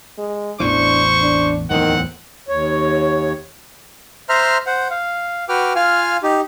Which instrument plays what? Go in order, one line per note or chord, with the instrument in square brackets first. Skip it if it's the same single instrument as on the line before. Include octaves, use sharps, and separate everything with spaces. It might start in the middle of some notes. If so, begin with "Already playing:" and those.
[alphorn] G#3
[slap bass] A1 E2 E3 [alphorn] D4 [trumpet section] C5 C#6
[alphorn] D4
[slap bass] D1 E2 [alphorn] D#3 [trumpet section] C4 F#5
[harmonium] D#2 C#5
[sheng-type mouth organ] C5 E5 A#5 C6 F6
C5 F#5
F5
F#4 B4 G5 D6 F6
F4 F5 G#5 F6
D#4 G4